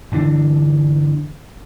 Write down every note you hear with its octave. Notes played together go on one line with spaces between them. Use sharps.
G1 D3 E3 D4